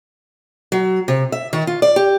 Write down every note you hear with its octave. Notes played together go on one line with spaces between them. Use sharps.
F#3
C3
E5
D#3
F4
D5
G4